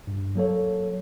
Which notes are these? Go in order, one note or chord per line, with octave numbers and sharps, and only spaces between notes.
G2
F#3 A#3 A4 C#5